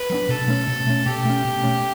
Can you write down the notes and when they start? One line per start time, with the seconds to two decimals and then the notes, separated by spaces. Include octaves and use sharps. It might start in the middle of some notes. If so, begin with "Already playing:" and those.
Already playing: B4
0.10 F#3 B3 D4
0.29 B2 A4
0.48 A3 C#4
0.68 B2
0.87 A3 C#4
1.06 B2 G4
1.25 A3 C#4
1.45 B2
1.64 A3 C#4